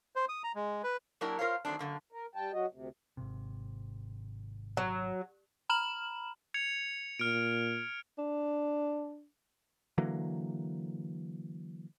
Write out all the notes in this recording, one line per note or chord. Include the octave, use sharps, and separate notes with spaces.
C5
D#6
A#5
G#3
B4
F#3 A#3 D4 E4 G4 A#4
F4 A#4 C5 C#5 F5
D#3 F#3 A3 C4 D4
F#2 D3 A#3
A#4
G3 G5 A5
F#3 F#4 D#5
D2 C3
G#1 C3
F#3
A#5 B5 F6 E7 F#7
G#6 C#7 F7
A#2 F6 D7
D4
D3 E3 F#3 A#3